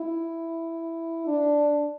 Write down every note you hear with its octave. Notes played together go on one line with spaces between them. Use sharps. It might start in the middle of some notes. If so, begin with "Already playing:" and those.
Already playing: E4
D4